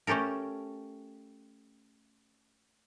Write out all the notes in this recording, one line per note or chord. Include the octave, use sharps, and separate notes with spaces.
A3 C#4 G4 A4 A#4